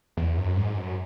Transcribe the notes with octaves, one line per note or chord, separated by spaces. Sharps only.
E2
F#2
G#2
F#2